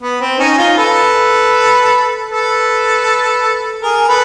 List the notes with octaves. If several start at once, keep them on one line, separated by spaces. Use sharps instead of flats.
B3
C4
C#4 D#4
D#4 F4
A4 B4
A4 B4
G#4 A#4
A4 B4